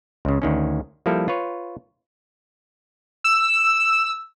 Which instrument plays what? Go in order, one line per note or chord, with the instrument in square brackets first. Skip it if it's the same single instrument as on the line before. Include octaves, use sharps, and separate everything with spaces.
[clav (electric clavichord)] C#2 C#3
D2 D#3 C#4
F3 G3 A#3 E4 A4
F4 B4 C#5
[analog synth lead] E6